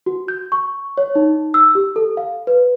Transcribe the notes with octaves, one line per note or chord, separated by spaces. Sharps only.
F#4
G6
C#6
C#5
D#4
E6
G4
A4
F5
B4